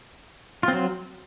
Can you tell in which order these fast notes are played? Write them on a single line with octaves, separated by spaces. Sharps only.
F4 C4 F#3